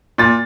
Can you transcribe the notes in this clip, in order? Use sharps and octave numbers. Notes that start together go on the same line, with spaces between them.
A#2 A6